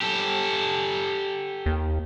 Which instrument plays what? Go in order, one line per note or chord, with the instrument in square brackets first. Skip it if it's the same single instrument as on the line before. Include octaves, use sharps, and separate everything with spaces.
[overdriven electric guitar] G4 A4
[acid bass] D#2